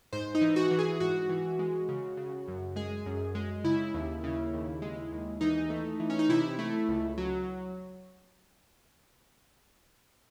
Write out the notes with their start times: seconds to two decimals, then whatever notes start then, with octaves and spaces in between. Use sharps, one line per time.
0.13 G#2 C5
0.35 D#4
0.41 E3
0.56 F#4
0.71 E3
0.79 G#4
1.00 G#2 F#4
1.29 E3
1.59 G#3
1.89 C#3
2.17 C#3
2.48 F#2
2.76 G#3 G#4
3.06 F#2
3.35 G#3
3.64 C#3 E4
3.94 D#2
4.24 C#3
4.53 D#2
4.82 G#3
5.12 D#2
5.41 E3 D#4
5.70 A3
6.00 E3
6.10 C#4
6.19 D#4
6.29 C3 E4
6.59 A3
6.88 C#2
7.18 F#3